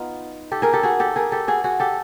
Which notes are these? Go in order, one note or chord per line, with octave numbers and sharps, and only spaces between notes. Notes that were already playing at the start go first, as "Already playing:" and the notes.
Already playing: B3 D#4 F4
G4 A4
G#4 A#4
G4 A4
F#4 G#4
G4 A4
G#4 A#4
G4 A4
F#4 G#4
F#4 G#4
G4 A4